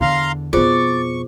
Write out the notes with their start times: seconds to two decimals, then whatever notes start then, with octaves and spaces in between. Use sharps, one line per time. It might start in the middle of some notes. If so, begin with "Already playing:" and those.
0.01 E2 D3 F5 A#5 C6
0.53 F2 B2 F4 G#4 C5 D5 C#6